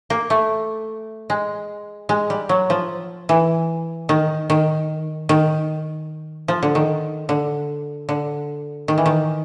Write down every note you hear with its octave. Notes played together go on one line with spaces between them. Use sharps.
A#3
A3
G#3
G#3
G3
F#3
F3
E3
D#3
D#3
D#3
F3
D3
D#3
D3
D3
D#3
E3
D#3